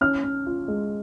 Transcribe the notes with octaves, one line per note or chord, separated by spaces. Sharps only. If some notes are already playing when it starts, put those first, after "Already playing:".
C#4 F6
C#4
F4
G#3